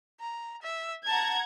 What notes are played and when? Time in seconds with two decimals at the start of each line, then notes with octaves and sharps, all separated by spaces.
0.20 A#5
0.62 E5
1.07 F#5 A5 A#5 G#6